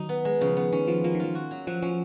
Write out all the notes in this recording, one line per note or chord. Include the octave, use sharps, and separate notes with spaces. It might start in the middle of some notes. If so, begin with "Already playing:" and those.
Already playing: D#3 F#3 D#4
B3
G#3
C#3 F3
B3
D#3 C#4
F3 F4
F3 A#3
D#3
F3 F4
F#4
F#3
F3 F#3
F3 C#4